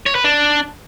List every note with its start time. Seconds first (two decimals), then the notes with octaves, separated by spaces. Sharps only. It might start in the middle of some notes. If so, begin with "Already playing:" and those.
0.06 C#5
0.15 B4
0.24 D4